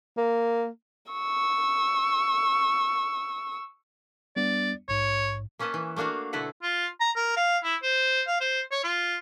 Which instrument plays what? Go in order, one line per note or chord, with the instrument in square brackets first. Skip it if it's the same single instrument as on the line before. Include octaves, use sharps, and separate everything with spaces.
[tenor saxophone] A#3
[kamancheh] C#6 E6
[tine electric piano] G3 B3 D4 [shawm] D5
[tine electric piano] A#1 G#2 [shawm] C#5
[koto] A#3 C#4 B4 D#5 A5
E3
A3 A#3 D4 F#4 F5
B2 D3 E4 A4 B4 F#5
[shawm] F4
A#5
A#4
F5
E4
C5
F5
C5
C#5
F4